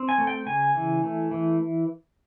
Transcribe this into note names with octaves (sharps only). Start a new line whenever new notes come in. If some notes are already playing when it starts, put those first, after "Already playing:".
Already playing: C4
G#5
A3
G5
C#3 G#5
E3
A3
E3